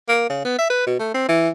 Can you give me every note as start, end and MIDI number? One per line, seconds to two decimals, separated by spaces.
0.08 0.26 58
0.29 0.43 49
0.45 0.54 59
0.58 0.68 76
0.70 0.86 71
0.87 0.98 47
0.99 1.12 57
1.14 1.28 60
1.28 1.49 52